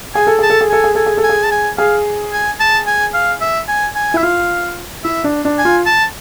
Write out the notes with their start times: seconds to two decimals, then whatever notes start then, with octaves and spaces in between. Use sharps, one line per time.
0.15 G#4 G#5
0.27 A4
0.39 G#4 A5
0.50 A4
0.61 G#4
0.70 A4 G#5
0.84 G#4
0.95 A4 G#5
1.06 G#4
1.17 A4
1.23 G#5
1.29 G#4
1.43 A5
1.51 G#5
1.78 G#4 F5
2.32 G#5
2.60 A5
2.87 G#5
3.14 F5
3.41 E5
3.68 G#5
3.95 G#5
4.14 E4 E5
4.23 F4 F5
5.04 E4 E5
5.24 D4
5.45 D4
5.58 G#5
5.65 F4
5.86 A5